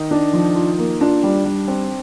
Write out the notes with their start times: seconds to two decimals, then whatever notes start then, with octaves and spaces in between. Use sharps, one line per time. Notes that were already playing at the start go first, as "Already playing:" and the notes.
Already playing: D#3 D#4
0.11 D4
0.33 F3
0.56 F4
0.79 A#3
1.01 D4 F4
1.23 G3
1.46 G3
1.68 C4